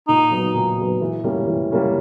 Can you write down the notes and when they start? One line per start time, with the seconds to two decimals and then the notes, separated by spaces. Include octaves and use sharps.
0.08 A#2 D#4
0.31 F#3 B3
0.54 A#2
0.78 F#3 B3
1.01 E3
1.24 G3 A#3 C#4
1.48 E3
1.71 G3 A#3 C#4